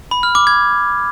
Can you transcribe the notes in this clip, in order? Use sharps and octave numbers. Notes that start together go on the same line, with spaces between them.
B5
F6
D6
G#6